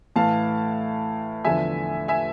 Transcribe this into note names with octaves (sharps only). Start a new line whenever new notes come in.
A2 E3 F5 A5
E2 D3 F3 E5 G#5
E5 G#5